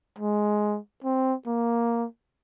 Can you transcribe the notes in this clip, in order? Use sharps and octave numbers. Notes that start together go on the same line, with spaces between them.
G#3
C4
A#3